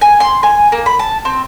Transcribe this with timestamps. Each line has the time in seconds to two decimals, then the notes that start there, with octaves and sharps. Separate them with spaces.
0.01 G#5
0.20 C6
0.43 G#5
0.72 A#3
0.86 B5
0.99 A5
1.25 C4